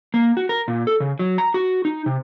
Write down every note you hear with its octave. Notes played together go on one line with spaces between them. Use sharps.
A#3
F#4
A#4
A#2
A4
C#3
F#3
A#5
F#4
D#4
C3